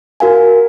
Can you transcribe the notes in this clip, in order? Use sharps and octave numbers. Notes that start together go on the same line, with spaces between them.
F#4 A#4 F5 G#5